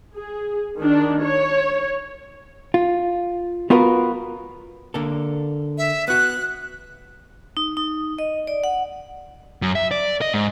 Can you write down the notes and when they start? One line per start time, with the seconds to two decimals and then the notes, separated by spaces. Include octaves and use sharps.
0.15 G#4
0.78 D#3 D4
1.22 C#5
2.74 F4
3.70 B3 F4 F#4 A#4 B4
4.94 D3 A#3 A4
5.78 E5
6.08 B3 F#4 F#6
7.57 D#4
7.77 D#4
8.19 D#5
8.47 D5
8.64 F#5
9.62 F#2
9.75 E5
9.91 D5
10.21 D#5
10.34 G#2